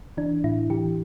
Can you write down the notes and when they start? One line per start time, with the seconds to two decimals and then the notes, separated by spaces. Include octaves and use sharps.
0.17 E3 D4
0.44 A2 E4
0.70 E3 G4